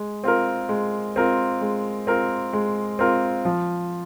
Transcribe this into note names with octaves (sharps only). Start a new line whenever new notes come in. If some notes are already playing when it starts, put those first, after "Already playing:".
Already playing: G#3
C4 F4 A#4
G#3
C4 F4 A#4
G#3
C4 F4 A#4
G#3
C4 F4 A#4
F3